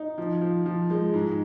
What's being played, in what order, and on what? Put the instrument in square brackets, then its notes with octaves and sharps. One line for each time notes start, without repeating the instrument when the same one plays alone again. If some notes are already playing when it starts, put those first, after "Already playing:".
Already playing: [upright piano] D#4
F3
F3
F3
G#3
G#2